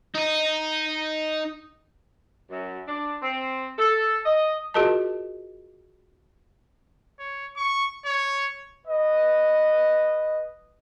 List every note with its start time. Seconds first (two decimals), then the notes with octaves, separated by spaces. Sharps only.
0.15 D#4 D#5
2.50 F#2
2.87 D4
3.22 C4
3.78 A4
4.25 D#5
4.74 F4 F#4 G#4 A#4 D#5 A5
7.19 C#5
7.57 C#6
8.06 C#5
8.86 B4 D#5